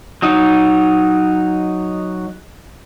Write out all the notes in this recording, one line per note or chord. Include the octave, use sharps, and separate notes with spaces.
F#3 D#4